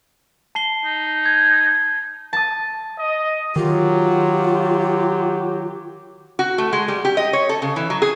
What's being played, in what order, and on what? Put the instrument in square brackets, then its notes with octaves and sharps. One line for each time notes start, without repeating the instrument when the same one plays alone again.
[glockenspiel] A5 C7 G7
[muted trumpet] D#4
[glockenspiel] G#6
[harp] A5 D#6
[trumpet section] D#5
[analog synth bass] D#3 [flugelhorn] F#3 [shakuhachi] F4 [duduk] G4
[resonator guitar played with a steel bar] F#4
A3
G#3
G3
G4
D#5
C#5
A4
C#3
E3
F#3
G#4